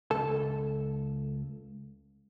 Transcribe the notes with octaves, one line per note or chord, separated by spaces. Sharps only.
C#2 A4 A5